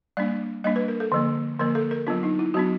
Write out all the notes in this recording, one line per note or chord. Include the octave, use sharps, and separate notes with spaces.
G3 A#3 D4 D5
G3 A#3 D4 D#5
B4
A#4
A4
D3 F3 A#3
D3 F3 A#3 A#4
A4
A#4
F#3 B3 D4 F4
D#4
E4
F#3 B3 D4 F#4